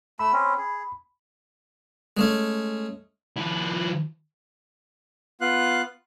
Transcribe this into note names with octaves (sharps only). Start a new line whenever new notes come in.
A3 B5 E6
C4 C#4
G#4
G#3 A3 C#4
F3 E4
B3 F4 F5 F#6